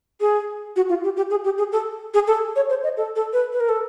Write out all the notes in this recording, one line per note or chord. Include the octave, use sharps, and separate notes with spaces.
G#4
F#4
F4
G4
G4
G#4
G4
G#4
A4
G#4
A4
C#5
C5
D#5
A4
A4
B4
B4
A#4
A4